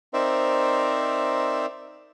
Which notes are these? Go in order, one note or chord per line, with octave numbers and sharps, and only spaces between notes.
C4 D#4 A#4 C5 D5 E5